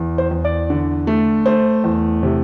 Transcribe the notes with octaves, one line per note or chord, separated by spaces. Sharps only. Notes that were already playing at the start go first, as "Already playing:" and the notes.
Already playing: E2
C5
E2
D5
D3
A3
A3 C5
E2
C3